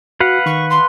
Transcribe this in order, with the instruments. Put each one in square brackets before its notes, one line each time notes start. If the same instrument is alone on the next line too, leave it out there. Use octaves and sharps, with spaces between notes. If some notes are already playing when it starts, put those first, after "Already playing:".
[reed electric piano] F#4 [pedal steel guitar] B4 F5 F#5
[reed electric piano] D#3 [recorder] C#6
[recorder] C6